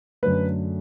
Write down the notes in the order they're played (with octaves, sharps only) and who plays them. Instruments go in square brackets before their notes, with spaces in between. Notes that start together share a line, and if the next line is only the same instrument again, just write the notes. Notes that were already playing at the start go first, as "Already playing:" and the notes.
[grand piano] F#2 D3 F#3 A3 B4